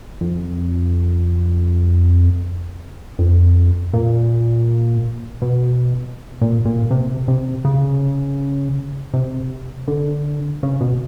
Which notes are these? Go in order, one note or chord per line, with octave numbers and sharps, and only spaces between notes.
F2
F2
A#2
B2
A#2
A#2
C3
C3
C#3
C3
D3
C#3
B2